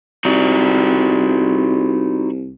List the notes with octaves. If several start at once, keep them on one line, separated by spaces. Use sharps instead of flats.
C2 D#4 F#4 D5